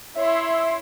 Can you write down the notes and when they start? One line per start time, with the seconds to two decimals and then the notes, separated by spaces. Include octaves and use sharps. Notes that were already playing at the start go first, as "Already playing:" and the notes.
0.15 E4 C#5 E5 C6